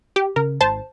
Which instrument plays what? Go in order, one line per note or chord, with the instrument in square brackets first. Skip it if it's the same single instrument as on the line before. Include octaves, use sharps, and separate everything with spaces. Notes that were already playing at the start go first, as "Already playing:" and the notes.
[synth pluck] G4
[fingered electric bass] C#3 [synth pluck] A#4
[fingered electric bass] G#1 [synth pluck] C5 A5